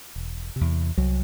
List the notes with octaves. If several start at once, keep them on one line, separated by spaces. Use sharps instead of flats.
E1
E2 C3
C2 F#3